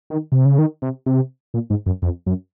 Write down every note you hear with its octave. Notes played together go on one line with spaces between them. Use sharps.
D#3
C3
C#3
D#3
C3
C3
A#2
G#2
F#2
F2
F#2